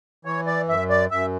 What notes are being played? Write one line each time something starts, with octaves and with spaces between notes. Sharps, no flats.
E3 C#5
D5
F#2 E5
D5
F#2 E5